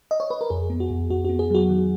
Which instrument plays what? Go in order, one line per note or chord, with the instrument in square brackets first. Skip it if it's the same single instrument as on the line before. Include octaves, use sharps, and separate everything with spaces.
[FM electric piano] D#5
C#5
B4
A#4
F2 G#4
B3
F#4
F2
F2 F#4
B3 F#4
G#4
F#3 F#4
D#3